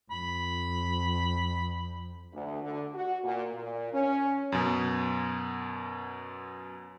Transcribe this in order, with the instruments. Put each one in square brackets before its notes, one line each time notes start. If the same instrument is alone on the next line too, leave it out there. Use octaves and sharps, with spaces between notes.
[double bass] F2 [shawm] B5
[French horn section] D2
D3
F#4
A#2
A#2
C#4
[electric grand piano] F#2 B2